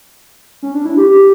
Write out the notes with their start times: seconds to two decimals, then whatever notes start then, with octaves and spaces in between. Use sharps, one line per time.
0.63 C#4
0.75 D4
0.86 E4
0.97 G4
1.10 G4